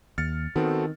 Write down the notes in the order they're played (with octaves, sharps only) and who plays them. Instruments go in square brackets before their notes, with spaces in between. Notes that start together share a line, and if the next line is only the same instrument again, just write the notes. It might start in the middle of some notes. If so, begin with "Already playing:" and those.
[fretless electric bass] D#2 [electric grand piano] F6 A6 C#7
[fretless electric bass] D#3 [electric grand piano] B3 C4 [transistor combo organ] F#4 A4